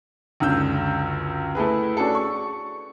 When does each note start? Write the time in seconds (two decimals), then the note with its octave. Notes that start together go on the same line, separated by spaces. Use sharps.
0.40 C#2 F#2 D3 E6 G6
1.55 A3 E4 G#4 B4
1.97 C#4 D4 F#4 G#4 A4
2.15 C#6